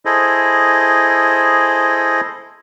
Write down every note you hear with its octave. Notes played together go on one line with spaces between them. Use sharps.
E4 G#4 A4 C5 D#5